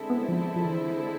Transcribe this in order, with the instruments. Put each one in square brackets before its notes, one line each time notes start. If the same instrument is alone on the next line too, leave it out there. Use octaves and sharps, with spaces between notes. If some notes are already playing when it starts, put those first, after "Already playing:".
Already playing: [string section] D3 G#3 C4 E4 A4
[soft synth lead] B3
F3
F3
E3